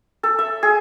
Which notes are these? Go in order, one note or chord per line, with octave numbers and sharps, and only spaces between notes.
A4
E5
G#4